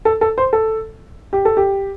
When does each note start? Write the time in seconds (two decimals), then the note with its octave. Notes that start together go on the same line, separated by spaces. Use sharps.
0.05 A4
0.21 A4
0.38 C5
0.53 A4
1.33 G4
1.45 A4
1.57 G4